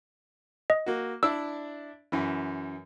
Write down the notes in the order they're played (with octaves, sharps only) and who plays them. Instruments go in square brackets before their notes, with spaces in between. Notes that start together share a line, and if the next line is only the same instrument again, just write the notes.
[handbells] D#5
[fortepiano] A#3 F#4
[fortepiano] D4 E4 D5 [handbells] E6
[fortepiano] F#2 E3